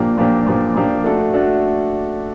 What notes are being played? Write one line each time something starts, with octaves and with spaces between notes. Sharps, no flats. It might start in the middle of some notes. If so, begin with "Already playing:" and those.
Already playing: A#2 F3 A#3 D4 G4
A#2 F3 A#3 D4 G4
A#2 F3 A#3 D4 G4
A#2 F3 A#3 D4 G4
A3 D4 F#4 A4
A3 D4 F#4 A4